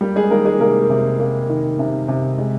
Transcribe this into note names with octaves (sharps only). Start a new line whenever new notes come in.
G3 A#3 G4
G#3 G#4
D#3 A#3 A#4
G#3 G#4
C3 A#3 A#4
C3
A#3
D#3
C3
C3
G#3